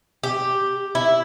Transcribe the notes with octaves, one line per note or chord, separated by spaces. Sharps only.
G4
E4